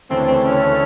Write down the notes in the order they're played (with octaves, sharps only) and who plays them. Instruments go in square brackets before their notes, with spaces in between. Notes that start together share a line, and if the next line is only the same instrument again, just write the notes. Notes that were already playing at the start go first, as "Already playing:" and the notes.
[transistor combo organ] D2 C#3 E3 A3 [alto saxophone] C4
[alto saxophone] C4
C#4